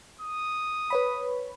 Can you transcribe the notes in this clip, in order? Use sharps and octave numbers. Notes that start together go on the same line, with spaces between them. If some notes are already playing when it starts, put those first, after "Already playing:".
D#6
B4 C#5 B5